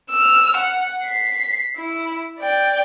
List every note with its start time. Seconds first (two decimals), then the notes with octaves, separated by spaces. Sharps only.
0.10 E6 F6
0.57 F#5
1.03 B6 C7
1.77 E4
2.39 D5 G5